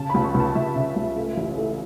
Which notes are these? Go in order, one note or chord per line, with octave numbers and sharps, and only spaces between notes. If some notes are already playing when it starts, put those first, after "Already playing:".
Already playing: C#3 A5
C#2 B5
C#6
C#2
A5
C#2 E5
C#3
C#2
A3
A1
A3